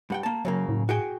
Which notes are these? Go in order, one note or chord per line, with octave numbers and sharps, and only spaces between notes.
G2 F#5 G5
A#3 A5
F#2 C#3 F#3 A#3
A2
F#4 G#4 G5